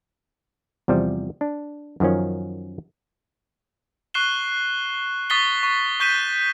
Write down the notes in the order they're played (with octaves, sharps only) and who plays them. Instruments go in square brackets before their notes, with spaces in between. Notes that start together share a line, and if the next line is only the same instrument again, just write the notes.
[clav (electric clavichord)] E2 C3 F3 G3
D4
F#2 D#3 F3 C#4
[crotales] C#6 F#6 C7 E7 G7
C#6 D#6 A6 B6 C7 G7
C#6
C#6 G6 B6 D#7 E7 G7